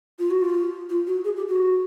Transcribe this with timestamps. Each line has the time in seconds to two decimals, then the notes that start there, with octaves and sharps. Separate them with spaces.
0.19 F4
0.30 F#4
0.42 F4
0.89 F4
1.07 F#4
1.25 G#4
1.37 G4
1.48 F#4